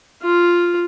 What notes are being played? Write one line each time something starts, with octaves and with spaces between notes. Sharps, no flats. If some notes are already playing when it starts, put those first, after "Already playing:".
F4